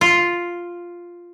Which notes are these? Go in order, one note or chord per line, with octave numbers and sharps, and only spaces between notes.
F4